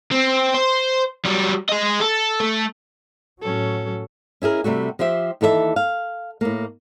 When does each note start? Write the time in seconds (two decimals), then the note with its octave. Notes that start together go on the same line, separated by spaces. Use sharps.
0.11 C4
0.55 C5
1.25 F#3 G3
1.69 G#4 D#5
2.01 A4
2.40 A3
3.41 A2 F#3 C#4 A4
4.42 C#4 E4 G#4 A#4
4.64 C3 G3 A3 F#4
4.99 F3 G4 C5 E5
5.41 D#2 E3 A4 C#5 E5
5.76 F5
6.41 A2 A#3